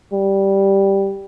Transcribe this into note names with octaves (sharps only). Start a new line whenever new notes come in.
G3